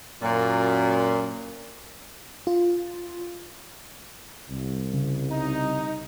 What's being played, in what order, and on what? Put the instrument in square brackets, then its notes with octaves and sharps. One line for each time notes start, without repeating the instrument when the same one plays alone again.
[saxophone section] F#2 A#2
[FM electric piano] F4
[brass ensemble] C2
[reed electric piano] C#3
[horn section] D#4